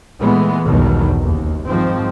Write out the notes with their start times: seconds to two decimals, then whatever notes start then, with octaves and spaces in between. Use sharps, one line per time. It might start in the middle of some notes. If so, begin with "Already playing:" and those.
0.20 A#2 E3 G#3 A3 B3
0.65 B1 E2 G2 B2 D#3 F#3
1.21 F#1 D#2
1.68 G#2 D#3 F3 C4